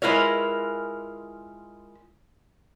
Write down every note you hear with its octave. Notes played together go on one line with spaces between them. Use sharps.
G#3 E4 F4 A#4 B4 C#5